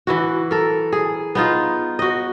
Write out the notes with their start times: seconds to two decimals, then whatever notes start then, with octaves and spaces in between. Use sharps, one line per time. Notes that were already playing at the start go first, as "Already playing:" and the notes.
0.07 E3 E4 F#4
0.51 A4 A#4
0.92 G#4
1.35 B3 D#4 F4
1.99 F#4 D#5